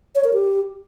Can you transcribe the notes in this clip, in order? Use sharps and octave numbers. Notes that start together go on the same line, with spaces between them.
C#5
A#4
G4